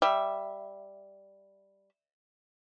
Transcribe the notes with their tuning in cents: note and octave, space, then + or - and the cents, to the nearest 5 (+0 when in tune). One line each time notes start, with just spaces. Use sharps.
G3 +0 E5 +0